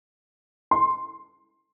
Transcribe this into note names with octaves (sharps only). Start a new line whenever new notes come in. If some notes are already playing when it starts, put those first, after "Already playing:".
C6